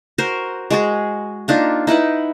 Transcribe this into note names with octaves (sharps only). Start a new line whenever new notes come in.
F#4 A#4 C5
G#3 F#4 G#4
A#3 D4 D#4 F4
D#4 E4 B4 F#5